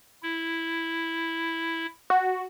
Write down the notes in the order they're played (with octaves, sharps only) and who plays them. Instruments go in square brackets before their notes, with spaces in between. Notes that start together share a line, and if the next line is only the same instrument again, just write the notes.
[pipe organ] E4
[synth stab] F#4